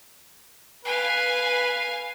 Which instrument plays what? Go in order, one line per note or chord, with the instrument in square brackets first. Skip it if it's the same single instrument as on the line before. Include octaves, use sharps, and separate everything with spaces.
[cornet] B4 [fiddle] F5 G#5